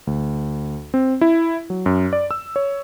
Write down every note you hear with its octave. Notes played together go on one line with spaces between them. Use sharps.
D2
C4
E4
F#3
F#2
D5
E6
C#5